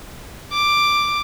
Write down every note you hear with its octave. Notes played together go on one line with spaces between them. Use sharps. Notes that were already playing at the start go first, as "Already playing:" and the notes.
D6